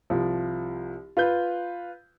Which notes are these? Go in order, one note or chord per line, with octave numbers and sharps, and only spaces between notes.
C2 F3
F4 B4 G6